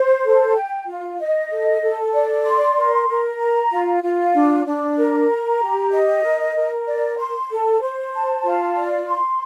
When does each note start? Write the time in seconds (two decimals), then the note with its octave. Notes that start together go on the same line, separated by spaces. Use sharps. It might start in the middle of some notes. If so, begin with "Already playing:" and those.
Already playing: C5
0.24 A4
0.55 G5
0.87 F4
1.19 D#5
1.50 A4
1.81 A4
2.14 D5
2.45 C6
2.77 A#4
3.09 A#4
3.40 A#5
3.71 F4
4.03 F4
4.34 D4
4.66 D4
4.97 A#4
5.30 A#5
5.61 G4
5.92 D#5
6.23 A#4
6.55 A#4
6.87 D5
7.19 C6
7.50 A4
7.81 C5
8.13 A5
8.44 F4
8.76 D5
9.07 C6